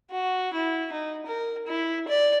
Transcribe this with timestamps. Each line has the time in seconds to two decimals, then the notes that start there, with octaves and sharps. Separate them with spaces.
0.11 F#4
0.53 E4
0.92 D#4
1.26 A#4
1.67 E4
2.08 D5